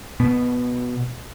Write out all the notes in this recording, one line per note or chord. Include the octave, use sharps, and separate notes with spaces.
B2 B3